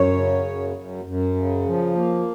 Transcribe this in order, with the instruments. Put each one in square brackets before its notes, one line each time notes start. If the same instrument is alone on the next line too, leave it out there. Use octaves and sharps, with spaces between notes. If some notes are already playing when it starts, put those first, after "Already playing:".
Already playing: [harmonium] F#2 C#5
C#3
F#2
F#2
F#2
C#3
F3
A#3